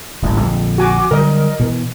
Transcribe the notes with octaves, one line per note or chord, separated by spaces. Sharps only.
D#1 A1 F2
A#1 F2 D3
F#4 G#5 D6
D3 F#3 G3 A#4 D#5
B2 E3